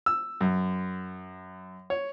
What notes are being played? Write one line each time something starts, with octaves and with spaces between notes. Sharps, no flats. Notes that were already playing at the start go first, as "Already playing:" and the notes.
E6
F#2
C#5